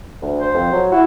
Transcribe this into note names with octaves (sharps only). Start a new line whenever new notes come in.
D2
C5
F2
F#3
E4 F#4